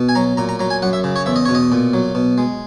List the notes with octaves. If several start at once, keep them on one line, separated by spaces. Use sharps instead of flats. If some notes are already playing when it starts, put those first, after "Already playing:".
Already playing: B2
G#5
F#3 A#5
A#2 A#5
A#5
F#3 A#5
G#5
F#2 F#5
E5
C#3
C#5
E2 E5
D#5
B2 C#5
D#5
A#2
F#3
B2
G#3